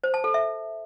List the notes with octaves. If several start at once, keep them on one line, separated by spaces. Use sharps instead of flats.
C5
A5
A4
E5